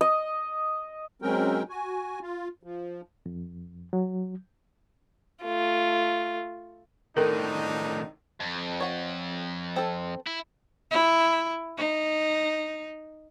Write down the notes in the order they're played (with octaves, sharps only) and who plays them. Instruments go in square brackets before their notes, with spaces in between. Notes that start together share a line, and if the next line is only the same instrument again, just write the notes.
[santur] D#5
[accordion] F#3 G#3 C4 C#4 A#4 G5
F#4 G#5
F4
F3
[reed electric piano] F2
F#3
[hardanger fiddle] A3 F4
[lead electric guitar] A2 D#3 [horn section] C4 D4 D#4 [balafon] A4 A#4
[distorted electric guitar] F2
[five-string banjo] C#5 F#5
C4 A4
[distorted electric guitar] E4
[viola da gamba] E4
D#4